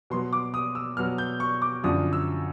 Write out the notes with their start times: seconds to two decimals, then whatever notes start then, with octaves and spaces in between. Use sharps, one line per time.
0.10 B2 F#3 B3 C6
0.33 D6
0.54 D#6
0.75 E6
0.97 B2 F#3 B3 F6
1.18 G6
1.40 C#6
1.62 D6
1.83 F#2 D3 F3 D#6
2.13 E6